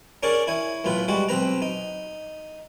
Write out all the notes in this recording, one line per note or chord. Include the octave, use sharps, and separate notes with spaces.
C#4 D4 G#4 A#4 C#5 D5
E4 C#5 G#5
B1 A2 F4 B4
G3 G#3 F#4
B1 C4 B4 A#5
D#4